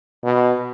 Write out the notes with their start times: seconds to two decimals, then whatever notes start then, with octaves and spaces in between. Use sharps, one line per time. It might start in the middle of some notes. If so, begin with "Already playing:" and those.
0.24 B2